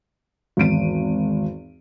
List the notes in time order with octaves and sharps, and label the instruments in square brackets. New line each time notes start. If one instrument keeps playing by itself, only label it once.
[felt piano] G#1 E2 D7 D#7